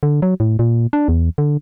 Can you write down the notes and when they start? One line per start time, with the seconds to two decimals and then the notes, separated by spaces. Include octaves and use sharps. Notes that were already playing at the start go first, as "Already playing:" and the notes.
0.03 D3
0.22 F#3
0.40 A2
0.59 A#2
0.93 D4
1.08 E2
1.38 D3